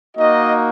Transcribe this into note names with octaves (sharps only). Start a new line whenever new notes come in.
A#3 D#4 F#4 D#5